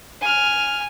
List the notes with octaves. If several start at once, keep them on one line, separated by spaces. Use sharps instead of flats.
G#5 F6